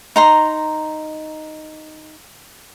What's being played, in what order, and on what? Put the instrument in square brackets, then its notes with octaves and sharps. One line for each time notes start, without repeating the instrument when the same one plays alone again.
[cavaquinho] D#4 A#5 C6